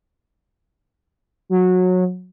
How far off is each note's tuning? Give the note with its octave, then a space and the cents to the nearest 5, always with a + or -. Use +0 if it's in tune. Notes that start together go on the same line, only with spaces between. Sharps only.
F#3 -20